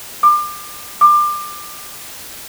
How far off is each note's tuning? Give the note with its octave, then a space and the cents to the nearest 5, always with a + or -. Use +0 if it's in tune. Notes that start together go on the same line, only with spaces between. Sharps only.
D6 +30
D6 +25